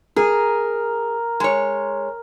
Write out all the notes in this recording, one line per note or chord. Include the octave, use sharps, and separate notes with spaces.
G#4 A#4
G#3 C#5